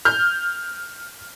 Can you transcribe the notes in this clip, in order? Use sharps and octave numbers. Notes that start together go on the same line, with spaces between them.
F6 G6